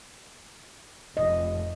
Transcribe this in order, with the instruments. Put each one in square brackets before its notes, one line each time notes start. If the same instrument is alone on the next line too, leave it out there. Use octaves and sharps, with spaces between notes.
[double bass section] F1 [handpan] D#5